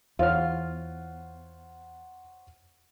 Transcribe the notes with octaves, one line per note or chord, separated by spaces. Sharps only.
E2 F4 C5 C#5 F#5 F6